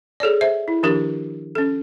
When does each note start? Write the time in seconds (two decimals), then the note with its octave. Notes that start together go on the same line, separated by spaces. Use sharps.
0.20 G#4 A4 C#5 D5
0.41 C5 E5
0.68 E4
0.83 D#3 F3 D4 G4 A#4
1.55 C#4 A4